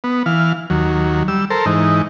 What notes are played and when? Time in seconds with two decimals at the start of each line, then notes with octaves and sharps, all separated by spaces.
0.04 B3
0.26 E3 F5
0.70 D#2 F#3
1.28 G3 E6
1.50 A4 A#4 C5
1.66 G#2 E3 D#4